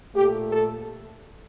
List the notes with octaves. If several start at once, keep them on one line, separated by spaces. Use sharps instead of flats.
A#2 A3 G4
A4